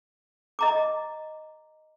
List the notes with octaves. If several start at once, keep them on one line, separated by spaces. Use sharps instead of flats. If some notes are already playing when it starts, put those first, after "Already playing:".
D#5 A#5 D6